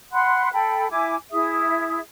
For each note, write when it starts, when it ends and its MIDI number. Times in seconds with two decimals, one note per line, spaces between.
0.12 0.48 78
0.12 0.48 83
0.12 0.48 84
0.12 0.48 90
0.52 0.88 69
0.52 0.88 79
0.52 0.88 83
0.90 1.15 64
0.90 1.15 80
0.90 1.15 86
1.31 1.99 64
1.31 1.99 68
1.31 1.99 76
1.31 1.99 87